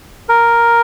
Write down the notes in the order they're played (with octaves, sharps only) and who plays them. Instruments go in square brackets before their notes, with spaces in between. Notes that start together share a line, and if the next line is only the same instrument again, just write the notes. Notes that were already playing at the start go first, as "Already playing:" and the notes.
[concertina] A#4